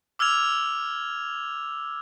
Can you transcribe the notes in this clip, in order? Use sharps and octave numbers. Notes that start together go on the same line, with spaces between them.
D6 E6 F6 G#6 F7